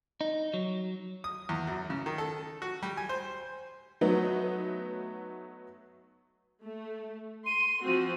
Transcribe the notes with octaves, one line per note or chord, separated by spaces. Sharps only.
D#4
F#3
D#6
E2
F#2
C#3
D#3
A4
F#4
G3
G#5
C5
F#3 A3 B3 D#4
A3
C6 D#7
F3 C4 F#4